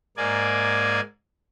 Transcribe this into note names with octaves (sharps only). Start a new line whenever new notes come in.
G#2 A#3 D5 G#5